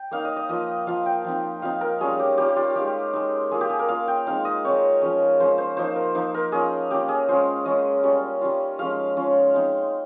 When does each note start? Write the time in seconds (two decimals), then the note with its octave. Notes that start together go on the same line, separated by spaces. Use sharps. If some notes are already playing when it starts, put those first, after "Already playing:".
Already playing: G5
0.11 A#3 D#4 F5
0.25 D#5
0.37 D#5
0.49 F3 A#3 F4 D#5
0.87 F3 A#3 F4 F5
1.06 G5
1.24 F3 C4 D#4
1.62 F3 C4 D#4 F5
1.81 A#4
2.01 G3 C#4 F4 G#4
2.19 G4
2.38 G3 C#4 F4 G4
2.56 F4
2.76 G#3 D#4 G4
3.13 G#3 D#4
3.51 A#3 F4 G#4
3.61 G4
3.70 G#4
3.79 A#4
3.88 A#3 F4 F5
4.08 G5
4.27 G#3 C4 D#4 F5
4.45 D#5
4.64 G#3 C4 D#4 C#5
5.01 F3 G#3 C#4
5.40 F3 G#3 C#4 C5
5.58 C5
5.77 F3 A#3 D#4 C5
5.96 A#4
6.15 F3 A#3 D#4 C5
6.35 A#4
6.52 A#3 C#4 F4 G#4
6.91 A#3 C#4 F4 G4
7.09 G#4
7.29 G#3 C#4 F4 C5
7.65 G#3 C#4 F4 D#5
8.04 G3 C#4 F4
8.41 G3 C#4 F4
8.79 F3 G#3 C#4 F4 F5
9.17 F3 G#3 C#4 F4
9.54 G#3 C4 D#4